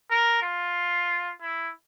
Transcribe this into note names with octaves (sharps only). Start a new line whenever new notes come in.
A#4
F4
E4